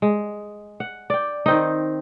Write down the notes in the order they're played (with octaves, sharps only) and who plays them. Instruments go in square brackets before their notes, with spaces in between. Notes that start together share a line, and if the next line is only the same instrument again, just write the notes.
[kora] G#3
F#5
D5 G5
D#3 C4 D#4